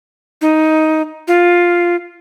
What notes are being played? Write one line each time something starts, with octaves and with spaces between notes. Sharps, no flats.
D#4
F4